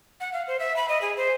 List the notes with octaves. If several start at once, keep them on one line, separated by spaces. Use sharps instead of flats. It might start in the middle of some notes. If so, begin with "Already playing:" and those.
F#5
F5
C5
E5
B5
D#5
G#4
C5